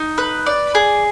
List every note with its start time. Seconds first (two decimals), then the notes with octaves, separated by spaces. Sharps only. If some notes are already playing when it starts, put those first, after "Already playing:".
Already playing: D#4
0.18 B4
0.46 D5
0.75 G#4